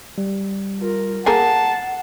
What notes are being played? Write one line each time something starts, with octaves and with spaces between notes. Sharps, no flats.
G3
F4 A#4
A#3 G#4 A#4 F#5 A5 C7